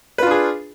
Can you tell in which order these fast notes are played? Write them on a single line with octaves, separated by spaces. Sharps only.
B4 F4 D4 G#4